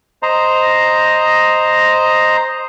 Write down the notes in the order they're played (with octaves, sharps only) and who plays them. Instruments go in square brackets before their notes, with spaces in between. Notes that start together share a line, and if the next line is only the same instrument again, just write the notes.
[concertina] C5 D#5 A#5